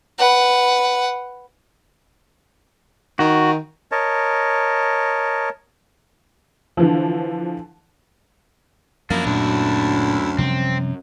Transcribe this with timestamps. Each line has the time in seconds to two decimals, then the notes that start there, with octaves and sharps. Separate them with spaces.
0.18 B4 F#5
3.19 D#3 F#4
3.92 A#4 C#5 D#5 A5
6.77 D3 E3 F3
9.11 F#2 F3 A#3 D4 E4
9.26 D2 A#2
10.39 C3 F3 G3 C4